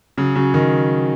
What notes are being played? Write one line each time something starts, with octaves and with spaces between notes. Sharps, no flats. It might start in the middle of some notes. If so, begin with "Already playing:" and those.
C#3 F#3
C#3 F#3
D#3